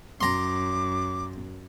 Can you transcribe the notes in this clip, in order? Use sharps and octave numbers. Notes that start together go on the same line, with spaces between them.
F#2 A#5 C6 D6